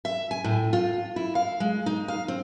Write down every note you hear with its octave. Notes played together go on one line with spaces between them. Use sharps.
E5
G#5
A2
F4
E4
F5
G#3
D#4
F5
C4